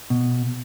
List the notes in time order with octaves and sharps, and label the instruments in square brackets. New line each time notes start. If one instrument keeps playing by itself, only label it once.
[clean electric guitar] B2